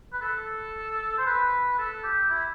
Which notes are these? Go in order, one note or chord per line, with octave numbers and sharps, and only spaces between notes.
B4
A4
C5
B4
A4
G4
E4